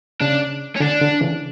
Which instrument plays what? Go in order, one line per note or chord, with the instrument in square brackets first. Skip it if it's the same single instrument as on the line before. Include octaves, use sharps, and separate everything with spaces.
[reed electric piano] C#3 [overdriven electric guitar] D4
[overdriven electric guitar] C#4
[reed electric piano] D3 [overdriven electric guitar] D4
[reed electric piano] D3
C#3 E3